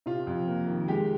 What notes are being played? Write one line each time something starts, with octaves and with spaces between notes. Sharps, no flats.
C3 F4
F2
A#3
D#3
G#3 G4